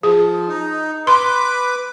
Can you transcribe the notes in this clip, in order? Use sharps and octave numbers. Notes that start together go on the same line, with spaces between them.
F3 G#4
D#4
B4 C6 D6